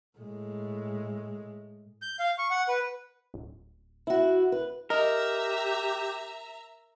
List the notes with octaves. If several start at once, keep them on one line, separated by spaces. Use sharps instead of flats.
A2 G#3
G6
F5
C#6
F#5
B4
D1
E4 F#4
B4
G4 A#4 D#5 E5 A#5